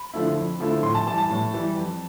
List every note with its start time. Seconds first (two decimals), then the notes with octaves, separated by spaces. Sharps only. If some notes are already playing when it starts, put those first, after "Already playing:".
Already playing: B5
0.14 D3 F3 A3 E4
0.37 F2
0.60 D3 F3 A3 E4
0.83 A2 C6
0.95 A5
1.07 E3 G3 A5
1.18 A5
1.30 A2
1.54 E3 G3
1.77 F2